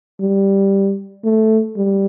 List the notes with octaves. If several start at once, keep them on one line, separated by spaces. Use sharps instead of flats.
G3
A3
G3